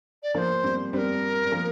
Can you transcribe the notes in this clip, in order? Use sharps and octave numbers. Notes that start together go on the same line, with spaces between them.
D5
F3 A#3 C5 D5
G3 C4
G3 C4 A#4 C5
G3
F3 A#3